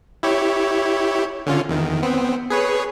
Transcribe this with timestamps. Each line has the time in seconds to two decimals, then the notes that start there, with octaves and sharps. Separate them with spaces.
0.23 E4 G4 C#5
1.46 D3 C#4 F4
1.69 E2 D#3
2.03 B3 C4
2.50 G#4 B4 C#5